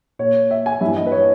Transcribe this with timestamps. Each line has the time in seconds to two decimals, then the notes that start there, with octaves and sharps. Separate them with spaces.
0.19 A#2 C#5
0.51 E5
0.66 G#5
0.81 G2 E3 E5
0.97 D#5
1.07 B4
1.12 C#5